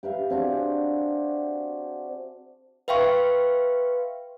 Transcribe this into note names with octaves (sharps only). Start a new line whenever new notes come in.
G4 B4 E5 F5
C4 D4 F#4 G#4
B4 E5 F5 G5 C6 C#6